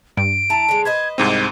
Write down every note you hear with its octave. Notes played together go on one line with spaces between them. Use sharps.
G2 D7
E4 A5 A#5
D3 G#3
B4 C5 D#5 G#6
C2 G#2 C4 D#7